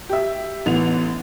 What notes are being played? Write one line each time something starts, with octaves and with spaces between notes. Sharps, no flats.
G4 E5
A1 E3 B3 F7